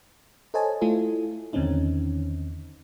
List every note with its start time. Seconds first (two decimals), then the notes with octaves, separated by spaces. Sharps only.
0.54 A4 C5 C#5 D#5 G#5 A5
0.81 A3 E4 F4 A4
1.53 E2 D3 D#3 C4 C#4 D#4